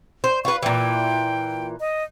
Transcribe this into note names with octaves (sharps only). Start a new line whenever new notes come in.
C5
F4 B4 C#6
A#2 E3 G5
D#5